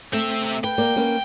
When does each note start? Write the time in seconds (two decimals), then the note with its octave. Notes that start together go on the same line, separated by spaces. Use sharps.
0.13 A3 C4 E5
0.64 B4 G5
0.78 A#3 D5
0.96 A#3 B3 C#4